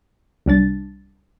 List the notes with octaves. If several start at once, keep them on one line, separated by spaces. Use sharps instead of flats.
C2 G3 D4 A6